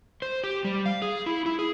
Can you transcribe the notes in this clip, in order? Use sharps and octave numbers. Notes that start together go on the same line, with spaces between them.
C5
G4
G3
F5
G#4
E4
E4
G#4